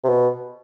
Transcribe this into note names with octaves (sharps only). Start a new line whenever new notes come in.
C3
B2